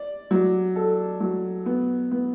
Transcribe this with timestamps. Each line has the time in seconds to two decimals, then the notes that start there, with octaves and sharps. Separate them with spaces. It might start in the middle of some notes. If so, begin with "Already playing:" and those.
Already playing: D5
0.31 F#3
0.75 A4
1.20 F#3
1.66 B3
2.11 B3